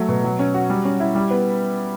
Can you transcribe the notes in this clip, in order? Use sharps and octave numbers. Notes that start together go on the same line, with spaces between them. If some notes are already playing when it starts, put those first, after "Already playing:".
Already playing: F#3 A3
B2
F#3
C#4
F#4
G3
C#4
E4
G3
B3